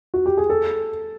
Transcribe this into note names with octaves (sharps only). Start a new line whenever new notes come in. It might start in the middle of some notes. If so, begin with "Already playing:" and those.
F#4
G4
G#4
A4